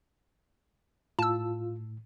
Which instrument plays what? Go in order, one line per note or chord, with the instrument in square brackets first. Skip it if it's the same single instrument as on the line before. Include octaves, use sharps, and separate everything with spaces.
[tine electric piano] A2 [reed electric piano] F4 [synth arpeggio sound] A5 E6